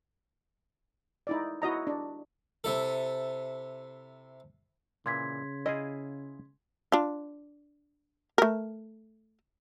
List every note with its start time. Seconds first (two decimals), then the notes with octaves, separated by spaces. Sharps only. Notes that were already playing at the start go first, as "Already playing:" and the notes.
1.27 D#4 E4 D5
1.62 E4 F#4 D#5 A#5
1.87 D4
2.64 C3 E4 A4
5.06 A#2 C#3 E3 C6 G#6 B6
5.66 E4 F4 G#4 D#5
6.92 D4 F4
8.38 A3 A#4